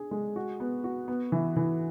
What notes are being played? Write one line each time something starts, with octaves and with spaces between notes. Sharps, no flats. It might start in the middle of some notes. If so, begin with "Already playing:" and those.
Already playing: D4 G#4
G#3
F#4
B3
F#4
B3
E3
E3